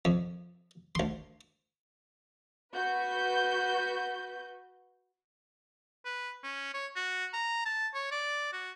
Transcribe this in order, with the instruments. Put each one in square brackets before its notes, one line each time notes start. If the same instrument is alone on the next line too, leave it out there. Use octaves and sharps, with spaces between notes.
[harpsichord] F2
D2 C6
[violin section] F#4 B4 G6
[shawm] B4
C#4
C#5
F#4
A#5
A5
C#5
D5
F#4